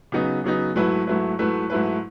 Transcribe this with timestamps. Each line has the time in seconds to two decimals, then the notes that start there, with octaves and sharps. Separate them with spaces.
0.12 C#3 F#3 B3 D#4
0.44 C#3 F#3 B3 D#4
0.75 G#2 F#3 A3 E4 B4
1.07 G#2 F#3 A3 E4 B4
1.39 G#2 F#3 A3 E4 B4
1.70 G#2 F#3 A3 E4 B4